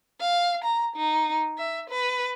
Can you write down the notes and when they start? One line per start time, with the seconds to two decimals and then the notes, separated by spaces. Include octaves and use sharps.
0.20 F5
0.64 A#5
0.96 D#4
1.58 E5
1.90 B4